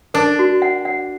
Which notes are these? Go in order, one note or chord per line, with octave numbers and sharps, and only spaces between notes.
D4 A#4
F#4
F#5
F#5